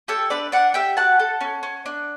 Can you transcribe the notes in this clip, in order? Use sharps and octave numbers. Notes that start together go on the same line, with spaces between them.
G4 A4 C#5
D4 B4 D5
D4 D5 F#5
G4 E5 G5
F#4 F#5 A5
A4
C#4
C#4
D4